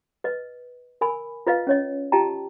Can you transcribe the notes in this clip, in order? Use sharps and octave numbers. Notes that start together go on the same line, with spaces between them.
B4 D#5
A#4 G#5 B5
F4 B4 D#5 F5
C#4 C#5 D#5
F4 G4 D#5 G5 A5 A#5